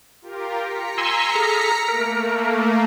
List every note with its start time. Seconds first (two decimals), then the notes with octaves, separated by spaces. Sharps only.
0.22 F4 G4 A#4
0.59 A#5 B6 C#7
0.98 G#5 C6 E6
1.35 G#4 A4 F6
1.88 A3 A#3 A#4